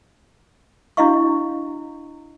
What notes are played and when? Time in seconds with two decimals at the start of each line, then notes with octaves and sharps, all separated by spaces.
0.97 D4 E4 F#4 D#5 F5 C#6